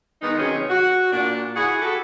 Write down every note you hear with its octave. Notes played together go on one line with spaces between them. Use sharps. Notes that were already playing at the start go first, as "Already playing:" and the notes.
D#3 G#3 B3 D#4
C3 D#3 F#3 C#4 G#4
F#4
A#2 D4
E4 F#4 G#4 F#5
F#4 G4 A4